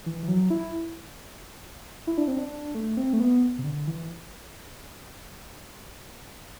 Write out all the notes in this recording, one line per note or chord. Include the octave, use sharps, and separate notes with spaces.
E3
E3
F#3
E4
E4
D4
C4
D4
A3
C4
A3
B3
C3
D3
E3